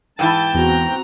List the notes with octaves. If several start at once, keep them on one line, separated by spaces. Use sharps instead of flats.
G#2 E3 E4 G5 A5
E2 C4 F#4 A#5